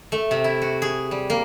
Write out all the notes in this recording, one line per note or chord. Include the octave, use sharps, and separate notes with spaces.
A3
C3
E4
F#4
G#4
G3
A#3